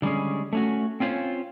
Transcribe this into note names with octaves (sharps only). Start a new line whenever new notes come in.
D3 G3 G#3 C#4 G#4
A3 C#4 F#4
C4 C#4 F4 C5 C#5